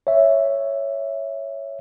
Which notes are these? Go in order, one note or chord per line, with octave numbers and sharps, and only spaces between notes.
C#5 E5